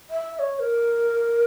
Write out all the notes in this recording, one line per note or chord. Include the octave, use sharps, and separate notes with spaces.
E5
E5
C#5
A#4